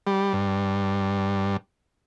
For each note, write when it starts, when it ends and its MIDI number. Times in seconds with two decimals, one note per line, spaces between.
0.07 0.33 55
0.33 1.57 43